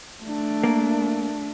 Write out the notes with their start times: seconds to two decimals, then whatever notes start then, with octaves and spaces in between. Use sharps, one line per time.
0.24 A3 D4
0.64 A#3